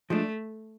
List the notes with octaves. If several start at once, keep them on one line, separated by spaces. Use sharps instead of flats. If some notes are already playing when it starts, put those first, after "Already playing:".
F3 G#3 A3 D4